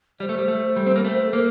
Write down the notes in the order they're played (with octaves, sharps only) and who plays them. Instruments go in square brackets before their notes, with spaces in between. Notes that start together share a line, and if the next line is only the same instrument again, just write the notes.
[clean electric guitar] G3 [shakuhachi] C5 D5
[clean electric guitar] A3
G3
A3
G3
C4
A#3
A3
[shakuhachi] A4
[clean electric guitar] A#3 [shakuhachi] C5